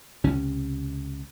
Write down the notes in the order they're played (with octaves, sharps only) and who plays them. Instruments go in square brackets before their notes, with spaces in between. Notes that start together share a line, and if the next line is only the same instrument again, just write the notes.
[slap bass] C#2 C3 C#4